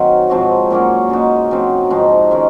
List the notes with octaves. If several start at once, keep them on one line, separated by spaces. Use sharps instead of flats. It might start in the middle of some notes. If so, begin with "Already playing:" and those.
Already playing: D#3 F#3 C4
G#2 F3 C4 F#4
A#2 F#3 A#3 C#4
C#3 G#3 D#4 F#4
C#3 F#3 C4
G#2 F3 C4 D#4
D#3 G#3 C#4